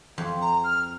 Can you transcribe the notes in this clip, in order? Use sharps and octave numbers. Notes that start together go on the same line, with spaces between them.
F2
A#5
F6